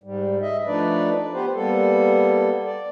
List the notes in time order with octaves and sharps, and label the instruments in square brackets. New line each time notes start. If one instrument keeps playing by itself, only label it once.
[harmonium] G#2 G3
D#5 E5
F3 A3 D4 D#4 B4 D5
B3 G4 B4 C5
G3 A#3 B3 A4
D5